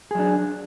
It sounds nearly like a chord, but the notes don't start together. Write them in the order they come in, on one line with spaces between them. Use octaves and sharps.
G#4 F#3 D4